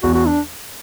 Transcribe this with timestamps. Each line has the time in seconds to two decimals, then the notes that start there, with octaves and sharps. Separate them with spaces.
0.03 E2 F#4
0.15 F#4
0.27 D4